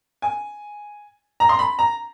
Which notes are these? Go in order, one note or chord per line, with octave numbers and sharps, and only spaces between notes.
G#5
A#5
C6
B5
A#5